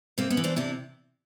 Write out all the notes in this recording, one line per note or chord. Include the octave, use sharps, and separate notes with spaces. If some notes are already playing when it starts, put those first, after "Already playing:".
C3 A#3 C4
B3 C#4
E3
C4 D4
C3 D4 E4